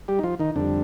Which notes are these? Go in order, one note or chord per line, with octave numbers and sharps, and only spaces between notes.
G3 G4
D#4
F3 F4
D#3 D#4
F2 D3 G3 D4